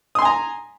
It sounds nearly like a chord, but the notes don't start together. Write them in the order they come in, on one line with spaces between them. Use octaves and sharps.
D#6 C6 G#5 A#5